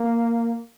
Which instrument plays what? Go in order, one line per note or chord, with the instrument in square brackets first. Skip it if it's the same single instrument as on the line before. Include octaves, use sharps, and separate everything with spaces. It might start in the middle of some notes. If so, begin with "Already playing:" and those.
Already playing: [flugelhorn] A#3